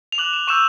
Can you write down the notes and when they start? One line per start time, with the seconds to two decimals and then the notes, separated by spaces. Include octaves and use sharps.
0.12 F7
0.18 D6 F#6 F#7
0.33 E7
0.48 C#6 E6 G6 E7